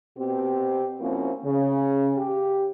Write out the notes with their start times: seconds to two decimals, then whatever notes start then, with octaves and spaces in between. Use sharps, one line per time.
0.18 B2 C4 G4
1.00 F3 A#3 C4 C#4 E4 F#4
1.45 C#3
2.18 G4